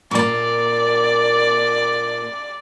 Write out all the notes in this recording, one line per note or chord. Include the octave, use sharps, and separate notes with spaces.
A#2 A#3 D5